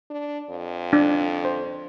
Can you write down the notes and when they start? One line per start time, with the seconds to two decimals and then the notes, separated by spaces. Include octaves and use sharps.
0.10 D4
0.50 F2
0.93 D4
1.45 C5